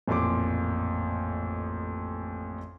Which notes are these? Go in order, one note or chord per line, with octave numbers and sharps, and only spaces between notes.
A1 F2 A#2 C6 D6